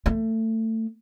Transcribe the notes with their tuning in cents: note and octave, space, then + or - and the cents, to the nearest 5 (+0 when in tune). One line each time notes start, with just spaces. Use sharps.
A3 +25